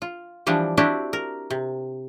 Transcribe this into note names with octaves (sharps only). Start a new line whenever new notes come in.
F4
E3 F3 G3 D4
C4 D4 E4 F#4 G4
A#4
C3